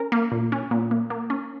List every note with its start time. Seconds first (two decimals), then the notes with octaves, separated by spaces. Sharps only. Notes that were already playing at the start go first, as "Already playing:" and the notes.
Already playing: C#4 A#4
0.12 A#3
0.32 A#2
0.52 C#4
0.71 A#2
0.91 A#3
1.10 A#3
1.30 C#4